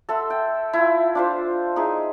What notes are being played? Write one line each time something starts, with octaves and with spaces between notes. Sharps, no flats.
A4 E5 F#5 C6
G5
E4 F4
D4 F4 C5
D#4 E4 G#4